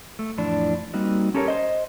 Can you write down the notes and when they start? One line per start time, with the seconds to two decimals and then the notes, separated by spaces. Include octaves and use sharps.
0.19 A3
0.37 F2 A2 E3 F3 D4
0.93 G3 A#3 C4 D#4 F#4
1.34 C#4 G4 A4 A#4 C5 C#5
1.48 C5 D#5